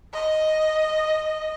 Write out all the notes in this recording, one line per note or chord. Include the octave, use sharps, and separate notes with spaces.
D#5